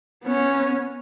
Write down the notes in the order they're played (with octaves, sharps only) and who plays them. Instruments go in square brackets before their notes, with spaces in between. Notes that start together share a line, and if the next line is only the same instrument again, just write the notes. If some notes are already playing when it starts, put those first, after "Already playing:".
[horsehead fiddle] B3 C#4